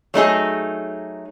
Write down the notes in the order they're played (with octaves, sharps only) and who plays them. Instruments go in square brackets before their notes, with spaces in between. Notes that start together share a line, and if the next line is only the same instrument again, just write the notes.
[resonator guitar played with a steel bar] F#3 A3 D#4 G#4